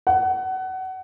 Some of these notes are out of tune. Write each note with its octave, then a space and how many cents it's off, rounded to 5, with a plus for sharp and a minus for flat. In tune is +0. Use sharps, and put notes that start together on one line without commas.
F#5 +25